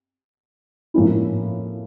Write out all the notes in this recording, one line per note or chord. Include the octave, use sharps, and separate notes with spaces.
A2 F3 A#3 C#4 E4